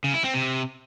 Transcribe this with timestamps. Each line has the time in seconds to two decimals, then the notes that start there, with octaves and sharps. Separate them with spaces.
0.04 C#3
0.14 E4
0.24 C4
0.34 C3